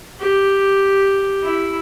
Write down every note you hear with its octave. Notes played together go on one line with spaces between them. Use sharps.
G4
E4